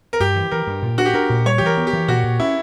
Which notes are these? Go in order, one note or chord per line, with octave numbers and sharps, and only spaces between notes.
A#4
G2 G4
E3
E3 A#4
G2
A#2
D4 F#4
G4
D4 A#4
A#2
G3 C#5
E3 G4
A#4
B3
G4
E3
A#2 F#4
A#2
C#4 E4